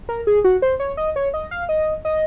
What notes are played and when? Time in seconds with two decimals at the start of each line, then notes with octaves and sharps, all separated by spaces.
0.09 A#4
0.27 G#4
0.44 F#4
0.62 C5
0.80 C#5
0.97 D#5
1.16 C#5
1.34 D#5
1.51 F5
1.69 D#5
2.05 D#5